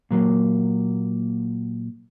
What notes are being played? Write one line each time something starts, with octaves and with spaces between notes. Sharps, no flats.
A#2 F#3 A#3